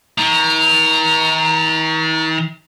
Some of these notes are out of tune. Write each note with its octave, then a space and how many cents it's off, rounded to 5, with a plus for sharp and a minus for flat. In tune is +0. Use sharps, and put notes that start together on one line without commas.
D#3 +45 A#5 -5